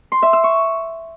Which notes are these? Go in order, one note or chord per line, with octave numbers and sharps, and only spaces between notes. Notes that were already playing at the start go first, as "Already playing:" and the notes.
C6
E5
E6
C#6